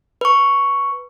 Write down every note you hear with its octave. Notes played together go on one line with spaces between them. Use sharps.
B4 C#6